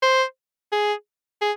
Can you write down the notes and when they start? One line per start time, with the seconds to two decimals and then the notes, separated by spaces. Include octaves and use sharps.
0.02 C5
0.72 G#4
1.41 G#4